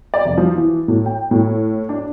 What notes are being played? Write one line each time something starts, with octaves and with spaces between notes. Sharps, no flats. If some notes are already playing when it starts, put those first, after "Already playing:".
D5
F1
F3
E3
A2
G5
A2
D4